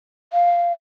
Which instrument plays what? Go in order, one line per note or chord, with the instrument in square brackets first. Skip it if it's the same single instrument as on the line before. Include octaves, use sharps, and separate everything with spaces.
[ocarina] F5